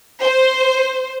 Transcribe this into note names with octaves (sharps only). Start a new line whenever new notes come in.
C5